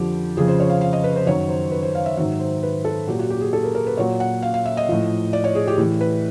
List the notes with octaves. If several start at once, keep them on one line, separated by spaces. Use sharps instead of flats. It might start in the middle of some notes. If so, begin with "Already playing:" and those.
Already playing: F2 D3 F3 G4
F2 C#3 F3 G#4
C5
C#5
F5
F5
D#5
B4
C5
F#2 D#3 F#3 C#5
C5
B4
C5
F5
E5
G#2 D#3 F#3 E5
C5
B4
A4
A#2 F#3 G4
F#4
G4
G#4
A4
A#4
A#4
B4
A#2 F#3 C#5
F#5
F5
F5
E5
D#5
A2 F3
D5
C#5
G#4
G4
A2 E3
B4